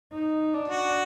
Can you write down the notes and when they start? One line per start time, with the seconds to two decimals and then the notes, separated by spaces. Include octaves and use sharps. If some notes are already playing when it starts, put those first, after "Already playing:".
0.13 D#4
0.54 D4
0.68 F#4